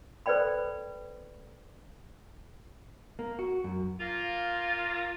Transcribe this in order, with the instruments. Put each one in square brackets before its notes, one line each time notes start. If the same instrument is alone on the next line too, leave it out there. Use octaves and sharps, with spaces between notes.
[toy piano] A4 B4 C5 D5 G5 B5
[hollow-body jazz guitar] A#3
F#4
F#2
[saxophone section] A#3 F4